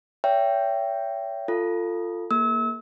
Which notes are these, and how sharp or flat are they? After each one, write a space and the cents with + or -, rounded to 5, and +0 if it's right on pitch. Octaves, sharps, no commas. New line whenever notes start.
C#5 +35 E5 +25 G5 +0
F4 +0 A4 +20
A#3 +0 G#4 +30 E6 -35